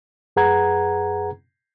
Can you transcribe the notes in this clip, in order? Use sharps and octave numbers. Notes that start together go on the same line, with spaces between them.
F#2 G#4 B4 F#5 A#5 G#6